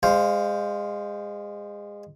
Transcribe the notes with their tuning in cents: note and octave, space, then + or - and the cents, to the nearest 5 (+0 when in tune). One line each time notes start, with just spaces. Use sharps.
G#3 -25 C5 +0 F5 +0